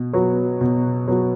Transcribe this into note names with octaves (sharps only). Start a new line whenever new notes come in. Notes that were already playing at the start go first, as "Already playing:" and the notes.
Already playing: B2
F#3 B3 F#4
B2
F#3 B3 F#4